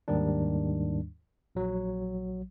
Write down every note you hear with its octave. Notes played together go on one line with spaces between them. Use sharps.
D#2 G#2 D#3 G3 D4
A#1 F#3